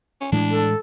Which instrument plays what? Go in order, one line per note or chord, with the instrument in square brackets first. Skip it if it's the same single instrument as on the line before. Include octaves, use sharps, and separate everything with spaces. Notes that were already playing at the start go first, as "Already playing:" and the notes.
[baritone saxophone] C#4
[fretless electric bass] A2 E3 G#3 [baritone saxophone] D4
[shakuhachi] A4